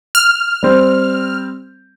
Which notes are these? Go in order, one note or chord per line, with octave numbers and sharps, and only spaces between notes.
F6
G3 C4